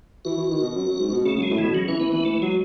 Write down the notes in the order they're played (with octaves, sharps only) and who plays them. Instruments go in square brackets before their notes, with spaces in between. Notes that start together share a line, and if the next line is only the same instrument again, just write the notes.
[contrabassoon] E3 [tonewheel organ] F#4
[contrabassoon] E3
D#3
B2
F#2
F#2
G#2
B2
[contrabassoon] C#3 [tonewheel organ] A3
[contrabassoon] F#2
[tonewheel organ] G#3
[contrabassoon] A2
[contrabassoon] B2 [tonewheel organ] E3
[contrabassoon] C#3 [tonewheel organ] F#3
[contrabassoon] E3 [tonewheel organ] C#4
[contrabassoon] E3 [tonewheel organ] B3
[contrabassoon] E3 [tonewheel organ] B3
[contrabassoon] E3 [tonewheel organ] A3
[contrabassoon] F#3 [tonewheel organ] G#3